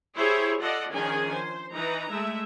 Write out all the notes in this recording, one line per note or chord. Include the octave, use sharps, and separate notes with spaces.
E4 G4 G#4 C5 C#5 E5
F4 A4 D5 D#5 F#5
D#3 F3 C#4 D4 G#4 G#5
C5
E3 D#4 B4 A#5
G#3 A3 E5